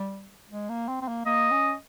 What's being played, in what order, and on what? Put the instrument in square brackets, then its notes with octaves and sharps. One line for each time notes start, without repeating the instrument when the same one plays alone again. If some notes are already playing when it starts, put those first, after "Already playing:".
Already playing: [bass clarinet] G3
G#3
A#3
C4
C4
A#3
[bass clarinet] A#3 [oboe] D#5
[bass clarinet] C#4